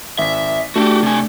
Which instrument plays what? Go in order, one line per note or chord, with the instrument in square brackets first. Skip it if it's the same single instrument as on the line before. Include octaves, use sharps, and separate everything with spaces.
[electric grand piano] G#1 B6 [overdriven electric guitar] E5
[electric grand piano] A3 D4 [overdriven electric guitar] F#4 G4
[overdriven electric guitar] C3 G#5